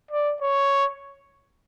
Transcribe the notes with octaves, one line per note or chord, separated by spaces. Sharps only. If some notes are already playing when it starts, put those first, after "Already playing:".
D5
C#5